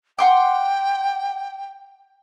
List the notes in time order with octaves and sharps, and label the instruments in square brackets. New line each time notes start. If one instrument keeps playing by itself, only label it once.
[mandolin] F#5 C6 D6 [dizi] G5